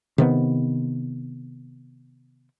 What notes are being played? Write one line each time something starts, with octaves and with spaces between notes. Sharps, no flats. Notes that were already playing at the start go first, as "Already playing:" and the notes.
C3 D#3 B3